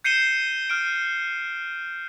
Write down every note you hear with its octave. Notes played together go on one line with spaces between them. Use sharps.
G6 C7 C#7 D#7 E7 G7
F6 D7